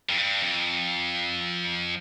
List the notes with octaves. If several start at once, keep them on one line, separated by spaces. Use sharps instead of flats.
F2
G2
F2